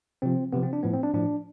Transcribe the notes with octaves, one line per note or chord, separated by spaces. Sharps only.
C3 F3 C4
C3 F3 B3
C4
D4
A2 F3 B3
C4
D4
A2 F3 D4